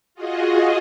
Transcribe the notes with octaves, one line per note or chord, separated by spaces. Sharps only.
F4 F#4 G#4 D#5